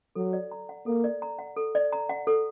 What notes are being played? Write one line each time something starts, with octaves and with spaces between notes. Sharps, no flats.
F#3 A4
D5
A#5
F#5
A#3 A4
D5
A#5
F#5
A4
D5
A#5
F#5
A4